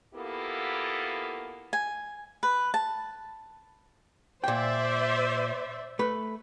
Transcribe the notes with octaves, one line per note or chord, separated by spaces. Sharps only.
A#3 B3 E4 F4 G4 A4
G#5
B4
A5
A#2 C5 D5 E5 G5
A3 B4